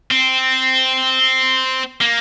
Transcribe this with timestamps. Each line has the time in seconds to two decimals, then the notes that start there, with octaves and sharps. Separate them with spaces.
0.11 C4
2.01 A#3